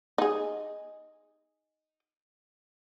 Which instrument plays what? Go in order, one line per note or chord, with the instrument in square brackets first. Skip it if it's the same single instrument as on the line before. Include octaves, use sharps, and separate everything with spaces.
[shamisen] D#4 G#4